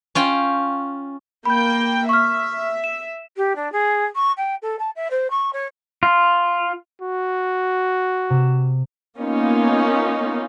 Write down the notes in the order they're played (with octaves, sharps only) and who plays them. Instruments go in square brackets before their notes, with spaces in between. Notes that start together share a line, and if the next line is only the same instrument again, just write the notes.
[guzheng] C#4 F4 G5
[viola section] A#3 G5 [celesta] B5 G6
[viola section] E5 [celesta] C#6 F6
[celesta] E7
[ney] G4
D4
G#4
C#6
G5
A4
A5
E5
C5
C#6
C#5
[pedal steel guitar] F4
[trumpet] F#4
[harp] C3 E7
[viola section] A#3 B3 C#4 D#4 F4